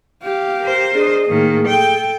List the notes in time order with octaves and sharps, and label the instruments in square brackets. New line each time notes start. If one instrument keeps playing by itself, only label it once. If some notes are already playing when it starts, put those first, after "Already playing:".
[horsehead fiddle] G4 F5
[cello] A#4 C5
[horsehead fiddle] D4 D#5 [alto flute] G#4
[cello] A2 D#3 [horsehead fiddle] A#3
[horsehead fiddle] A4 [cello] G5